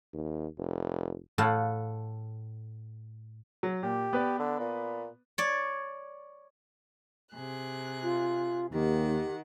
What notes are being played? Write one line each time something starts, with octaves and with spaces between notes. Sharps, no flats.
D#2
F1
A2 A4 F5 F#5 A5
F#3
A#2 G4
B3 B4 D5
D3
A#2
C#5 D5
C3 G#4 F#6
F4
D#2 D#3 G4 F#5